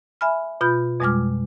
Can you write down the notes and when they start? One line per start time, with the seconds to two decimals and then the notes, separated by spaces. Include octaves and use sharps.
0.21 E5 G#5 B5 F6
0.61 B2 F4 B5 G6
1.00 F2 B2 G3 G#3 D6 F6